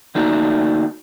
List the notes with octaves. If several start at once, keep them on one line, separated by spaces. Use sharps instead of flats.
D3 A3 A#3 D4 D#4 F#4